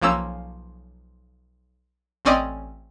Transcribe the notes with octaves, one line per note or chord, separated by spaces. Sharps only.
B1 F3 A#3 C#4 E6
A1 C4 C#4 D5 D#5